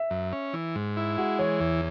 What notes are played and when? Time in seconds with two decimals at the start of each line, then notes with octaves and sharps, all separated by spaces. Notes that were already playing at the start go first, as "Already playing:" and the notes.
Already playing: E5
0.10 F#2
0.32 C#4
0.53 E3
0.75 G#2
0.97 E4
1.18 G#3 F#4
1.39 E3 C#5
1.60 E2